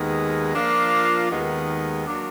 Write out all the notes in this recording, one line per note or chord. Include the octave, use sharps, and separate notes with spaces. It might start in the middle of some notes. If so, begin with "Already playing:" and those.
Already playing: D#2 D#3 G#3 B3
F3 A#3 D4 F4
D#2 D#3 G#3 B3
F#3 A#3 D4 F#4